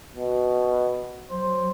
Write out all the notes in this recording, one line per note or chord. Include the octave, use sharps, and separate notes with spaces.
B2
F#3 C5